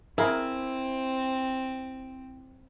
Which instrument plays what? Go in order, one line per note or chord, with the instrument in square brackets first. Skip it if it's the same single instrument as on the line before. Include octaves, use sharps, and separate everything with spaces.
[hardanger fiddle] C4 [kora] E4 [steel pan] G#4 A#4 F5